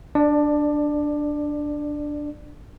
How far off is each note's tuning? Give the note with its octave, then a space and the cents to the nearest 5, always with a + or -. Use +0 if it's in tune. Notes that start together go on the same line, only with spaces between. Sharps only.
D4 +0 D5 +20